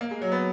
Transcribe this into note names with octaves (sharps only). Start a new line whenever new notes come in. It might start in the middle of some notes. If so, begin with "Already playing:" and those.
A#3
G#3
F#3
B3